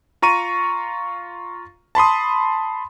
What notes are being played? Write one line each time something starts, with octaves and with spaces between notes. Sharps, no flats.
F4 A#5 C#6 D#7
A5 B5 C6 D#6